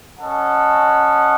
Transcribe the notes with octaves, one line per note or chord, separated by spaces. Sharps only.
C#4 A4 D#5 F#5